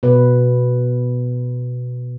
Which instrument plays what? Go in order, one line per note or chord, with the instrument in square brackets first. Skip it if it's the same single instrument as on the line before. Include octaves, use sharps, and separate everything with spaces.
[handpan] B2 B4